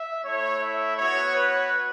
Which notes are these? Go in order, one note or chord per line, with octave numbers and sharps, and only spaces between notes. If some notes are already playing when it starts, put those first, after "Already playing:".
Already playing: E5
A3 E4 C#5
E5
B3 F#4 C#5
B4